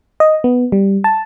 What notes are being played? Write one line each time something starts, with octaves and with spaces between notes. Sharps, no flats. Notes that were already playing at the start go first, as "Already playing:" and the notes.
D#5
B3
G3
A5